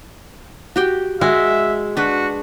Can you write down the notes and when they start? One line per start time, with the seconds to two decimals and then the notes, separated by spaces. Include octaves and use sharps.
0.76 F#4 G4 G5
1.21 G#3 F#4 E5
1.97 D4 F#4 B4